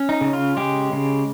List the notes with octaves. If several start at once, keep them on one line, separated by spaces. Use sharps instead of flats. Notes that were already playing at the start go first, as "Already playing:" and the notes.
Already playing: C#4
D#4
C#3
F4
G#3 G4
C#3